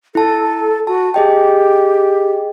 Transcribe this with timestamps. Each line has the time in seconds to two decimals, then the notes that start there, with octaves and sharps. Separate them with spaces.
0.15 E4 A4 A5
0.87 F#4 A5
1.14 G4 G#4 D#5 G5